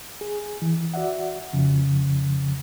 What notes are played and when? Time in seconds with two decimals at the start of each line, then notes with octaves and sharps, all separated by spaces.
0.21 G#4
0.62 E3
0.94 F#4 D5 E5 F#5
1.53 F2 C#3 F3